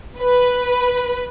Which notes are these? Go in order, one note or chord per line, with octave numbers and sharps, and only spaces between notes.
B4